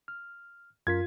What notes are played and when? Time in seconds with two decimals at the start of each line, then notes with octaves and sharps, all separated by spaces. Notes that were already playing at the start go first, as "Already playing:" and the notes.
0.08 F6
0.87 F#2 F4 A#4 G#6 B6